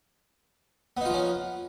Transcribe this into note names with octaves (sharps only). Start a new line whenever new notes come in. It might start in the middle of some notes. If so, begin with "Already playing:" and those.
F3 B3 C#4 D#4 F4